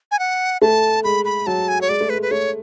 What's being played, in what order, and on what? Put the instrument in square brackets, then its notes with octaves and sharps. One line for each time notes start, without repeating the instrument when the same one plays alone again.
[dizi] G#5
F#5
[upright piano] A3 [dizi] A5
[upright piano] G#3 [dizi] B5
[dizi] B5
[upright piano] F#3 [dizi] A5
[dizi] G#5
C#5
[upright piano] G#3 [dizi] D5
[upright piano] A3
[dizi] B4
[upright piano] G#3
[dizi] B4
[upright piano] A3 [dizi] C#5